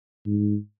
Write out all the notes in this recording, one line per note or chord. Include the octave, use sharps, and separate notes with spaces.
G#2